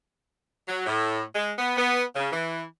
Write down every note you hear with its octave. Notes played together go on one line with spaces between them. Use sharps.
F#3
A2
G#3
B3
B3
C#3
E3